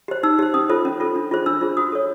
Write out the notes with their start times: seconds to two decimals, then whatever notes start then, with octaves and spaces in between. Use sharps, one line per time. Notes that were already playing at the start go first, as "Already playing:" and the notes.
0.08 G4 C5
0.23 D#4 E6
0.39 G4 C5
0.54 C#4 D#6
0.69 F4 A4 C5
0.85 C#4
1.00 F4 A4 C5
1.16 D4
1.31 F4 G#4 C5
1.46 D4 E6
1.61 F4 G#4 C5
1.77 F#4 D#6
1.92 A4 C#5